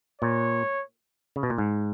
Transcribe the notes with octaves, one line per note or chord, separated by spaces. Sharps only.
A#2 C#5
C#3
B2
A#2
G#2